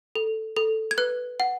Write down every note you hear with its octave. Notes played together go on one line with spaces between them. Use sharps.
A4
A4
G#6
B4 F#6
F#5